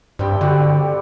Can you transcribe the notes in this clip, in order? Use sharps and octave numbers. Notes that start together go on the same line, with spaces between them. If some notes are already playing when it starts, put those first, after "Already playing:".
G2 G3 C4 G5
D3 G3 F#4 D5